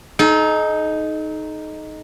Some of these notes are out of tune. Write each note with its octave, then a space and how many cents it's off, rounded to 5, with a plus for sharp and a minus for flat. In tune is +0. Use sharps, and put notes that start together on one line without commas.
D#4 +0 A4 -45